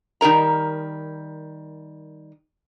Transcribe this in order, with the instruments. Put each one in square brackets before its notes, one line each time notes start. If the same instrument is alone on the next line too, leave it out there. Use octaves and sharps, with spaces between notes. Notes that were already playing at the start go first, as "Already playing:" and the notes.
[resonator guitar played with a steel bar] D#3 G3 A#4 A#5